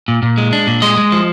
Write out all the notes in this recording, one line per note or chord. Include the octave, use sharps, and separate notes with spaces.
A#2
A#2
G#3
D4
A#2
G#3 D#5
G#3
F3